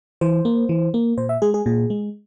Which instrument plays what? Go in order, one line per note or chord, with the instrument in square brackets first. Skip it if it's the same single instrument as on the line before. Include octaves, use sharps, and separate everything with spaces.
[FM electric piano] E3 C5
A#3
E3
A#3
A#2 C5
E5
G#3 G#4
G#4
A#2 G#4
G#3